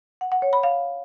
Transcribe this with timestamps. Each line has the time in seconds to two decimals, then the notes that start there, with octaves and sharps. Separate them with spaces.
0.21 F#5
0.32 F#5
0.42 C#5
0.53 B5
0.63 F5